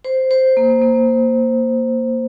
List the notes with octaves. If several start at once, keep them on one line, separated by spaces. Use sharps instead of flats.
C5
C5
A#3
A#3